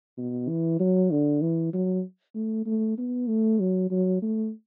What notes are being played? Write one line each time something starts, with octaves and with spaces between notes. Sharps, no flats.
B2
E3
F#3
D3
E3
F#3
A3
A3
B3
A3
F#3
F#3
A3